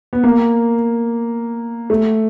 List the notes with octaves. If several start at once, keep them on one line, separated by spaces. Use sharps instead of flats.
B3
A#3
A3